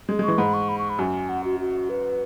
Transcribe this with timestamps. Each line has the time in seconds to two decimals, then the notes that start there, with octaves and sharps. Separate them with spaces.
0.09 G#3
0.19 G#3
0.23 E3 C#6
0.38 G#2 B5
0.54 C#6
0.69 B5
0.78 C#6
0.90 B5
0.99 F#2 G#5
1.29 F#5
1.44 F#4
1.60 F#4
1.89 B4